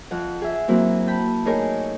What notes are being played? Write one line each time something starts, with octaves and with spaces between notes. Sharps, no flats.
F2 F#5
G#4 E5
F#3 A#3 C4 E4
G5 A5 B5
A3 D#4 G#4 A#4 C#5 G#5